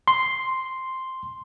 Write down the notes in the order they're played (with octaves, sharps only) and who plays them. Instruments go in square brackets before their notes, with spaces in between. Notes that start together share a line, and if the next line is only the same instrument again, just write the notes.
[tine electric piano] C6